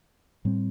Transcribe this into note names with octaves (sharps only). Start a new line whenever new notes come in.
A2 G3 C4